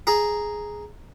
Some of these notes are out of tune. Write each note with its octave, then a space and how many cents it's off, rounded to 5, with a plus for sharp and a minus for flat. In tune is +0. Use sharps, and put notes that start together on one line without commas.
G#4 +5 A#5 +0